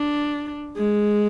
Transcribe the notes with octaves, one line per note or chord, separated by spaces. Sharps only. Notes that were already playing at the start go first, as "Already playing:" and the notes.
Already playing: D4
G#3